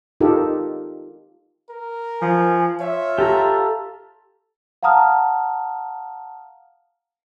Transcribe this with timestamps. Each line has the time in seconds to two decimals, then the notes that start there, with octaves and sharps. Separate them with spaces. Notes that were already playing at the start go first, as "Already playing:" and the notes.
0.21 D#4 F4 G4 A4 A#4
1.69 A#4
2.22 F3 G#5
2.80 F4 C#5 E5
3.18 G4 A4 A#5
4.83 F5 F#5 A5 A#5 D#6 F6